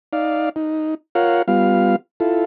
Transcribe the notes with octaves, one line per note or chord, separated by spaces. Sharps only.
D#4 D5 F5
D#4
F4 A#4 C#5 F5 F#5
G3 B3 F4 F5
E4 F4 A4